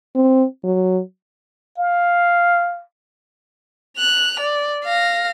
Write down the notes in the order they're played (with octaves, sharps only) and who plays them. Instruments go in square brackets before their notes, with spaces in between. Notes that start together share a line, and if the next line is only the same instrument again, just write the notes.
[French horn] C4
F#3
[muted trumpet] F5
[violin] F#6 F7
D5
F5 A#6